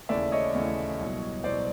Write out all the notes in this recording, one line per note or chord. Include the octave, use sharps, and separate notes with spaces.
D#2 C#3 E3 A3 D5 E5
C#5 D#5
D#2 C#3 E3 A3
C2 B2 F#3
C2 B2 F#3 C5 D5